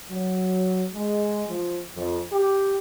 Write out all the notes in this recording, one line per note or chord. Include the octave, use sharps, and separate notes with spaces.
F#3
G#3
F3
F2
G4